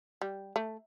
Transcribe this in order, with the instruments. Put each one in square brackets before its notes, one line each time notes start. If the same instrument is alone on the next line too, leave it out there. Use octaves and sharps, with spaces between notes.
[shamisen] G3
A3